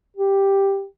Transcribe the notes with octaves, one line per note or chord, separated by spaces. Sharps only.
G4